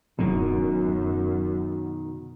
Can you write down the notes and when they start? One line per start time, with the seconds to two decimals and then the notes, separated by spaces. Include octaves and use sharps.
0.19 D1 F#2 B2 D#3